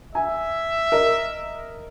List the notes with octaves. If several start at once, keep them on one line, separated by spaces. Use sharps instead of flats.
E5 G#5
A#4 D#5